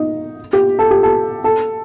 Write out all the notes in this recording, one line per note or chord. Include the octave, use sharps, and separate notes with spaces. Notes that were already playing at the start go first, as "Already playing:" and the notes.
Already playing: D#4
G4
A4
G4
A4
A4